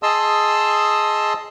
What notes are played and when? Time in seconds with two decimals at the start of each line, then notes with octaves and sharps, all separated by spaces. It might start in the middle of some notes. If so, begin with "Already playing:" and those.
0.03 G#4 D#5 A5 C6 D#6 E6